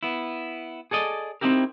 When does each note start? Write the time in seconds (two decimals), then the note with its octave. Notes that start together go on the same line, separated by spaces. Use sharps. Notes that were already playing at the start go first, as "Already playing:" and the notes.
0.03 B3 E4
0.91 G#4 A4 D5 D#5
1.41 C4 C#4 D#4 E4 G4 A#4